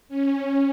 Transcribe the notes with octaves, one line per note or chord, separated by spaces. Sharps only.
C#4